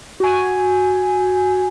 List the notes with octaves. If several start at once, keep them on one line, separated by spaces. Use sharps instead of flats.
F#4 G#5